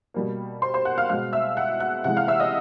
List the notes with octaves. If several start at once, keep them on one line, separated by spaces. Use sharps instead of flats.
B2 G3 A#3
C5 C6
C5 C6
F#5 F#6
F5 F6
B2 G#3 F5 F6
E5 E6
F#5 F#6
F#5 F#6
C3 E3 G#3 F#5 F#6
F5 F6
E5 E6
D#5 D#6